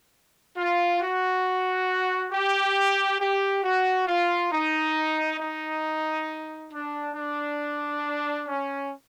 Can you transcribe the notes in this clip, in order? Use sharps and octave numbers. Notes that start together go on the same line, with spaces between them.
F4
F#4
G4
G4
F#4
F4
D#4
D#4
D4
D4
C#4